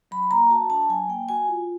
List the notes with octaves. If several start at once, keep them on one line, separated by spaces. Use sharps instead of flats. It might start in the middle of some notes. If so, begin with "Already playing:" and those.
F#3 B5
A#3 A#5
F#4 A5
D4 A5
F#3 G#5
A#3 G5
F#4 G#5
F4